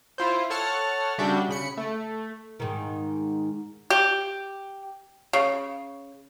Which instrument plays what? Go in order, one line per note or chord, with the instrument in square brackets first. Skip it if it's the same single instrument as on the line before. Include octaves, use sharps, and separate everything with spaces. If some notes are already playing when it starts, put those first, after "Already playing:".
[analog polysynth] E4 F4 C5
A4 C#5 F#5 A5 F6
C#3 G3 D4 F#4 E5 G6
C#3 B5 C#7
A3
[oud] G#2 D#3
[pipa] G4
C#3